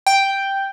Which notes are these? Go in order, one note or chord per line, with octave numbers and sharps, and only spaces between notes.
G5